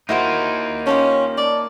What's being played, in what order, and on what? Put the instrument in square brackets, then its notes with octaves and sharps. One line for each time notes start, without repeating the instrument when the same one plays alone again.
[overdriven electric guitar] A#3 D#4 [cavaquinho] E4 F#4 C5
[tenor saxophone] C#4 [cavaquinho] F4 G4 A4
[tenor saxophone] D5 [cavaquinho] A5